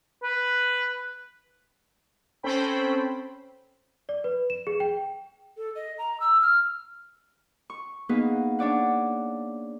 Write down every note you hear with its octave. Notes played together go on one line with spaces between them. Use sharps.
B4
C4 C#4 A4 C5 G5 B5
D5
B4
E7
G#4
G5
A4
D#5
A#5
E6
F6
C#6
A#3 B3 D#4 G#4 B4
D4 C#5 D5 F#5